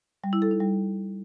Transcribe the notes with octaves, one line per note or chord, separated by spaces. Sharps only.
G3
E4
A4
D#4
G3